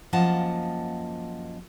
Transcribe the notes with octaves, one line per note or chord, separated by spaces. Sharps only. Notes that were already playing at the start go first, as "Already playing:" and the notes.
F#2 F3 A#3 D#5 F#5 A5